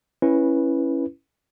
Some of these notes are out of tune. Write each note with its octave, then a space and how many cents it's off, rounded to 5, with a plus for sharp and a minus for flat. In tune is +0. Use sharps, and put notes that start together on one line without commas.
C#4 -15 E4 +0 B4 -10